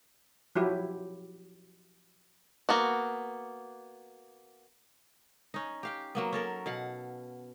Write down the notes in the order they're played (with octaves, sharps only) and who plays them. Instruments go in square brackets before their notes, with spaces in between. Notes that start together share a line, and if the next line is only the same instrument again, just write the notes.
[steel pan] F3 F#3 E4 G4
[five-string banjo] A#3 B3 F#4
[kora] C#4 D#4
G4 F5 G5
F#3 A#3 B3
C#4 A4 A#4
B2 F5 F#5